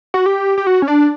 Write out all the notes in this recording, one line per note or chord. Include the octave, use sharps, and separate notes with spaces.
F#4
G4
G4
F#4
C#4
D4